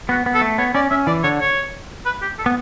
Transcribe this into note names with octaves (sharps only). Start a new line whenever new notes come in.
B3 F#4
B3
A4
A3
B3 C#5
C#4 D5
C#4 E5
E3 D5
D3 C#5
C#5
B4
G4
A4
B3